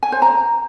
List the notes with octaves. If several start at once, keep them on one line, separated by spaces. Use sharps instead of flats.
G#5
C5
A#5